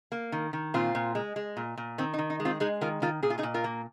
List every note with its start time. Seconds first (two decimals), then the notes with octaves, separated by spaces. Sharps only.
0.12 A#3
0.32 D#3
0.53 D#3
0.74 A#2 C4 F4
0.95 A#2
1.15 G#3
1.36 G#3
1.57 A#2
1.77 A#2
1.98 D#3 C4
2.14 D#4
2.18 D#3
2.30 D#4
2.40 G#3
2.45 C4 F4
2.60 G#3 D#4 G#4
2.81 D#3 F4 A#4
3.02 D#3 F4 A#4
3.22 A#2 G#4
3.30 F4
3.38 D#4 G#4
3.43 A#2
3.54 F4 A#4
3.64 A#3